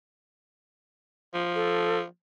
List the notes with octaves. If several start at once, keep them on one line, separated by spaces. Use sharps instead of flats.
F3
A4